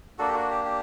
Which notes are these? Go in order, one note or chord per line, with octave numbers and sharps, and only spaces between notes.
A#3 D4 F#4 A4
G4
F#4
G4
G4